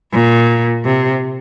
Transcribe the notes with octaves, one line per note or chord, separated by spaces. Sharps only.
A#2
C3